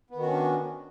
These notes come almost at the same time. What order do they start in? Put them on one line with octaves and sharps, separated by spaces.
B3 D#3 F#4 C#4 D4